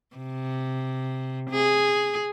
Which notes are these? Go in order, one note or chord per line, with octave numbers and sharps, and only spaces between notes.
C3
G#4